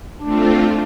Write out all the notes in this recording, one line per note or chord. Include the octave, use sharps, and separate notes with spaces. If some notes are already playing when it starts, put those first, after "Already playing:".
A3 C4 D4 F4